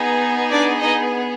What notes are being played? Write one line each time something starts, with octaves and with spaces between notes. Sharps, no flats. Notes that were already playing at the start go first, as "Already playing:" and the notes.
Already playing: B3 D#4 G#4
D4 D5
D#4 D#5